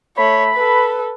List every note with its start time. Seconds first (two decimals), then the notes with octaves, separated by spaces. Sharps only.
0.17 A3 C#5 B5
0.55 A4 B4